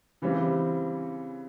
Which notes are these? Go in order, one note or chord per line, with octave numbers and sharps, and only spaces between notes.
C#3 E3 G3 C4